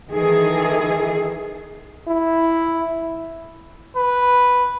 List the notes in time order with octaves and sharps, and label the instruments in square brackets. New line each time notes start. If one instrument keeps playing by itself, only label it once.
[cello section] D#3 E3 G#4 A4
[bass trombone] E4
[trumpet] B4